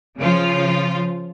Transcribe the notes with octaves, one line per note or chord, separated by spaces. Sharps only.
C#3 F3 F4